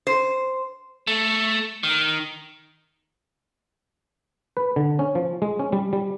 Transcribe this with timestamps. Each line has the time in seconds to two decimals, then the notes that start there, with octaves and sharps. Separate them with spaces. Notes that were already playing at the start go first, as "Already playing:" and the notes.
0.07 C5
1.07 A3
1.83 D#3
4.57 B4
4.76 D3
4.99 C#4
5.15 F3
5.42 G#3
5.59 C#4
5.73 G3
5.93 G3